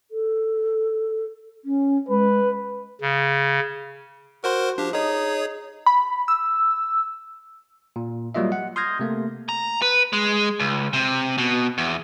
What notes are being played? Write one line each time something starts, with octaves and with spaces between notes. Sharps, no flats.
A4
C#4
G#3 B4
C#3
F#4 A#4 C5 C6
F3 D4 G4
D#4 G#4 C#5
B5
E6
A#2
F#3 G3 A#3 F4 D#5 E5
F#5
C6 D#6 F6 G6 G#6 A#6
C3 A3 A#3
A#5
B4
G#3
C#2
C3
B2
E2